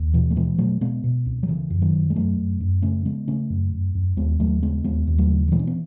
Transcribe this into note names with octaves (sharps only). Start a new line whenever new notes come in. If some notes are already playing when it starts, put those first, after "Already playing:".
Already playing: D#2
B2 E3
A3
B2 E3 G#3
B2 F#3 A3
B2 G#3 B3
B2
C#2
F#3
C#3 E3
F#2
D#3 F#3
F#2
G#3
F#2 F#3 A3
F#2
F#2
C#3 A3 C#4
C#3 G#3 B3
C#3 A3 C#4
F#2
F#2
F#2
D#2 G#3 B3
D#2 F#3 A3
C#3 G#3 B3
D#2 G#3 B3
D#2
F#3 A3
C#3
F#3
B2 E3 G#3
C#4
B3